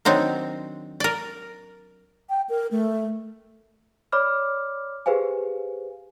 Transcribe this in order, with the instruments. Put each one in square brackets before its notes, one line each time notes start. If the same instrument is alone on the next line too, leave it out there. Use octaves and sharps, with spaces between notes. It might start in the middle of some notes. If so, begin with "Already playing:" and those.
[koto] D#3 F#3 C4 D4 D#4
A#4 D5
[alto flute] G5
A#4
A3
[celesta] C#5 D5 B5 D6 F6
G4 G#4 B4 C5 F5 G#5